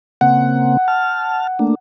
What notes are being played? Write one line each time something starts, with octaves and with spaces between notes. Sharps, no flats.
C#3 A#3 C4 F#5
A5 F6
A3 A#3 D4